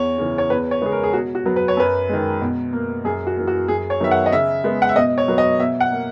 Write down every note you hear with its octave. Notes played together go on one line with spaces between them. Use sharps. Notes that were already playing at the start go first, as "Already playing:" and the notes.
Already playing: E2 C#5
C#3 E3
C#5
E2 B4
C#5
C#3 G#3 B3 G#4
A#4
G#4
B2 F#4
F#4
F#3 B3
B4
C#5
F#2 B4
D#3 G#3
B2
A#3
F#2 G#4
F#4
E3 A#3
F#4
F#2 G#4
C#5
D#3 F#3 B3 E5
F#5
D#5
C#3 E5
G#3 B3
F#5
E5
B2 D#5
C#5
F#3 B3
D#5
B2 E5
F#5
A#3